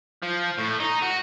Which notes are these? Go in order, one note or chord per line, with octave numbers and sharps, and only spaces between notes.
F3
A2
D#4
F#4